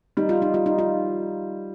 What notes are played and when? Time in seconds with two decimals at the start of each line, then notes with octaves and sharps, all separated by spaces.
0.17 G3 D#4
0.29 F4
0.42 D#4
0.54 G3 F4
0.66 D#4
0.79 F4